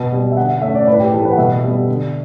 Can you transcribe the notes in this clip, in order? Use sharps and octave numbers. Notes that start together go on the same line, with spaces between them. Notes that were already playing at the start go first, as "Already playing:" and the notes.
Already playing: B2 B4
G3 B3
E5
D3 F#5
E5
A3 C#4 E5
D5
A2 B4
G4
E3 A3 A4
B4
F#5
B2 E5
G3 B3
D3